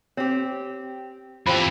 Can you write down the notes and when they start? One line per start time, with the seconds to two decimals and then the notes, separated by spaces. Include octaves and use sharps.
0.17 C4 G4 C#5
1.47 F2 E3 F3 C4 G4 B5